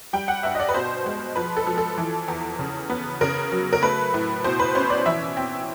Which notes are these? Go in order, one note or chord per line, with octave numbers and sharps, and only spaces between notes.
G3 G5
F#5
G2 E5
D#5
D5
B4
B2 C5
G#3
F3 B4
A4
F3
A4
E3
E2
C#3
B3
C#3 A#4
F#3
A#4
A3 B4
A2
B2 C5
B4
C#4 C5
D5
E3 E5
C4